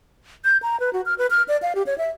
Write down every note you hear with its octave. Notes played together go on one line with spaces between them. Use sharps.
G6
A#5
B4
F#4
F6
B4
F6
D5
F5
G4
C#5
E5